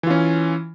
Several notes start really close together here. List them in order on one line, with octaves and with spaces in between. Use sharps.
E3 F4 C#4